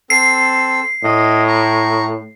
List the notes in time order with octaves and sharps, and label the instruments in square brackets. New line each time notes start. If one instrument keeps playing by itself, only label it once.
[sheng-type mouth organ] C4 A4 E6 [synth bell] C7
[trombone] A2 [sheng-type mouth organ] D#5
[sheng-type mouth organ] A#5 C#6